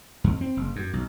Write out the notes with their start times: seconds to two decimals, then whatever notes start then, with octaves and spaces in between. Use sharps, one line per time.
0.24 F2
0.41 C4
0.57 F#1
0.76 F#2
0.93 B1